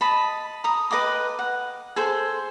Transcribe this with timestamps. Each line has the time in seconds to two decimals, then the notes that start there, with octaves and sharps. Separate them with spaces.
0.01 D#5 A5 B5
0.64 A#5 D#6
0.91 B4 D#5 G5 D6
1.39 F#5
1.96 G#4 A4 C5